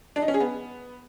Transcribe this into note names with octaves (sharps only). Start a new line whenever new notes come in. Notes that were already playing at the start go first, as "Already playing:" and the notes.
D4
D#4
C#4
G#4
B3